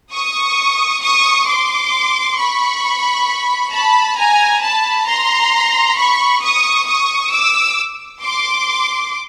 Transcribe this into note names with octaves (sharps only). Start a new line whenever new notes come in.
C#6 D#6
C#6 D#6
C6 D6
B5 C#6
A5 B5
G#5 A#5
A5 B5
A#5 C6
B5 C#6
C#6 D#6
C#6 D#6
D6 E6
C6 D6